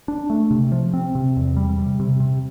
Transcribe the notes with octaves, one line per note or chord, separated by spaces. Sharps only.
D4
A3
C3
F3
C4
C3
E2
G3
C3
C3
C3